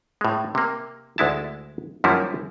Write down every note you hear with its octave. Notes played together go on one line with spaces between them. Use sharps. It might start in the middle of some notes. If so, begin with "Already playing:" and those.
A2 G#3
C3 A#3
D2 G#3 E4 A5
F#2 D#3 F3 G3 A#3 E4